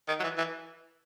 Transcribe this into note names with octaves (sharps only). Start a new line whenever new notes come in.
D#3
F#3
E3
E3